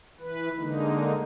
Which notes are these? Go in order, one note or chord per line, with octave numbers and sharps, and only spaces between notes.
E3 B4
D3 G#3 A#3 D#4